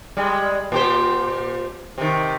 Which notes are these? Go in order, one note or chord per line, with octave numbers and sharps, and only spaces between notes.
G3 G#3
A#2 G4 C5
C3 D#3